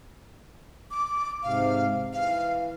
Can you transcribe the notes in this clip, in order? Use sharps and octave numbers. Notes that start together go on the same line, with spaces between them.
D6
G#2 C3 F5
E3 F5